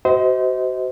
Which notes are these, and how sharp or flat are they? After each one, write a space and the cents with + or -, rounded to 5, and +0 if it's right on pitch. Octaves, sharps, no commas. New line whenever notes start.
F#4 +30 C5 -20 D#5 +35